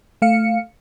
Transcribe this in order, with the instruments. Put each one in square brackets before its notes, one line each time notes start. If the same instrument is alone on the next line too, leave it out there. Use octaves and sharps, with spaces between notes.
[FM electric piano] A3 F5 C#7